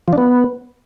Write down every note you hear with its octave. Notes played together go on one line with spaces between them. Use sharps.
F3
D4
B3